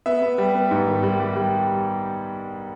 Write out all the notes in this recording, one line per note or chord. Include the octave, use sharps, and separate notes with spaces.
B3 E5
B3
G3
B3
G#2
D#3
G3
G3
G3